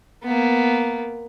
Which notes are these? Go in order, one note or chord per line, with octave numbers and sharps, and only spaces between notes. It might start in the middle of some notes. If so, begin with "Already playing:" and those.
A#3 B3